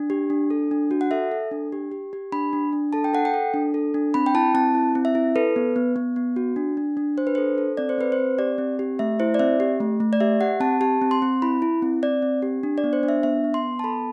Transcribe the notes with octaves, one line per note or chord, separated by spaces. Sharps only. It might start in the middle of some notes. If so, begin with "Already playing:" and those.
Already playing: D4
G4
D4
A4
D4
F#4
F#5
A4 E5
A4
D4
G4
G4
G4
D4 B5
D4
D4
A4 A5
G5
A4 F#5
G5
A4
D4
A4
D4
C4 B5
G5
E4 A5
C4 A5
E4
C4
E5
E4
A4 B4
B3
B3
B3
B3
F#4
D4
D4
D4
D4 C5
B4
A4 C5
A4
C4 D5
C5
C4 B4
C5
C4
G4 D5
C4
G4
A3 E5
E4 C5
D5
C4 E5
G4
A3
A3
D5
G4 E5
G4 F#5
C4 A5
G4 A5
C4
C6
C4
E4 B5
E4
C4
C4 D5
C4
G4
D4
D5
B3
C5
D4
E5
B3 E5
B3
C6
B3
A5
A4 B5